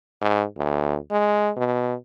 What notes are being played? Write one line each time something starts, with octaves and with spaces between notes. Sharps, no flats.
G#2
D2
G#3
B2